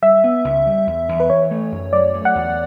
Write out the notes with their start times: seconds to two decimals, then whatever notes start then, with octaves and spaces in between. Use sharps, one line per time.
0.02 G3 E5
0.24 B3
0.44 C#2
0.66 G3
0.87 E2
1.09 E2
1.20 B4
1.29 E3 C#5
1.51 A3
1.72 F#2
1.93 F#3 D5
2.14 A3
2.25 F#5
2.35 E2